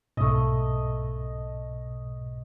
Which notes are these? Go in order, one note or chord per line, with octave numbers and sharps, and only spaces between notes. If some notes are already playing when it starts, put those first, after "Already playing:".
B1 G#2 B2 A3 D#5